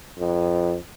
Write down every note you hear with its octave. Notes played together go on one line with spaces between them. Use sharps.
F2